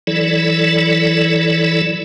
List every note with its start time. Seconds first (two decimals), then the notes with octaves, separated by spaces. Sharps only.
0.07 E3 F#3 E4 A4 D5